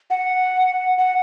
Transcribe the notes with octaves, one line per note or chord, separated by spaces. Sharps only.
F#5
F#5